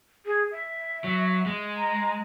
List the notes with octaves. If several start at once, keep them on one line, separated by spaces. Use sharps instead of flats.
G#4
E5
F#3
G#3
A#5